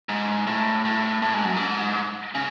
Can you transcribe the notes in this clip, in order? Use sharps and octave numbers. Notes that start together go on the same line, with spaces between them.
G#2
A2
A2
A2
G#2
F#2
G#2
C#3